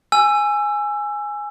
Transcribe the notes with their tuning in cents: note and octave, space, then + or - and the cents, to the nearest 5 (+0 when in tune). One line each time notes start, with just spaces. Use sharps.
G#5 +0 E6 +20